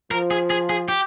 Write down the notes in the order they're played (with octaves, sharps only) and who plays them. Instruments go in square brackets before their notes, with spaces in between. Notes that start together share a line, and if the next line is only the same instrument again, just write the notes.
[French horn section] F3 [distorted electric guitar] A#4
[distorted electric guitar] G#4
G#4
G#4
G4